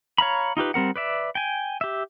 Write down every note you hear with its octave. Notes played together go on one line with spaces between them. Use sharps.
C#5 F5 A#5 B5
D#4 F4 G4 B4
G3 C4 A#4 F#5
B4 D5 E5
G5 G#5
G4 E5